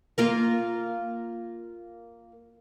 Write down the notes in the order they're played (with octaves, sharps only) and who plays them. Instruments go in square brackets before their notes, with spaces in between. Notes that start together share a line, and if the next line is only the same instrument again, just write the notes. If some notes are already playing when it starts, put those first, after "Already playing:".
[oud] A#3 F4 A#4